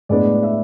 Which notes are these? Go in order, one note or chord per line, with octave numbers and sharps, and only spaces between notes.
A2 G#3 B3 D4 D5
E5